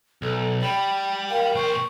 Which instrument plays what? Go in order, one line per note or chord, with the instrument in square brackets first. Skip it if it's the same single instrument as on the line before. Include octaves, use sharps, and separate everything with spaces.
[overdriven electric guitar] B1 [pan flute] A4
[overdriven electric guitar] G3 [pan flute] G5 [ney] B5
[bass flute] A#4 [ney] F5
[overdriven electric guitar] A#2 C5 [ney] C#6